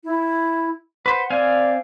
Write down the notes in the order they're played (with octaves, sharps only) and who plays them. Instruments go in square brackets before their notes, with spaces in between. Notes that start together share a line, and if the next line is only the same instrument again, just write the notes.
[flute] E4
[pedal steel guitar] B4 C5 [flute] F#5
[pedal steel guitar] C4 F5 G#5 [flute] D5